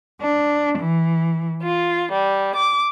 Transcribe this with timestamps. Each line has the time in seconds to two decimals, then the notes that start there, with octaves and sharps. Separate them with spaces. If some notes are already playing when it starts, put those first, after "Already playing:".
0.20 D4
0.78 E3
1.62 F4
2.12 G3
2.55 D6